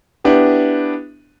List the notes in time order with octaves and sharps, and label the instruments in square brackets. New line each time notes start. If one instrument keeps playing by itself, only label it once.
[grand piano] B3 D4 E4 G4 B4